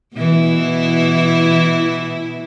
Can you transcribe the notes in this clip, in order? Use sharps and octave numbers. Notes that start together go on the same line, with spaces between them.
B2 E3 E4